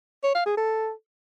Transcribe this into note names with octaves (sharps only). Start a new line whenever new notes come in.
C#5
F5
G#4
A4